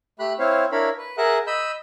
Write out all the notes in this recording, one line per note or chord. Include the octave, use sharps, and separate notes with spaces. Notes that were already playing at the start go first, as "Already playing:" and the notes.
A3 G4 B5 F#6
C4 E4 C5 C#5 F5
D4 E4 A#4 C#5 F5 B5
B4
G#4 A#4 E5 F#5 F#6
D#5 B5 E6 G6